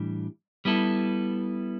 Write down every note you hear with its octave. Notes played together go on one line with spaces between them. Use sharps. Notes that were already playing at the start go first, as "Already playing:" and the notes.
Already playing: A2 E3 G3 D4
G3 B3 E4 A4